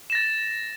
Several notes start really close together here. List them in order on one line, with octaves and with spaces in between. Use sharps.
E7 A#6 A6